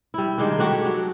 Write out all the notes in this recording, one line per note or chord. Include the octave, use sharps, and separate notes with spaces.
G3 E4
D#3 G#3 A#3 D4
A3 D4 F#4 G4
C#5
F#3 D4